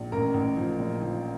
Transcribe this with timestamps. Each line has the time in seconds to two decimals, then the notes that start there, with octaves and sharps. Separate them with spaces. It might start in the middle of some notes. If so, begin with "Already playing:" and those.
Already playing: A#1
0.12 A1 A#4 A#5
0.34 A1
0.57 F3
0.80 A#1
1.02 F3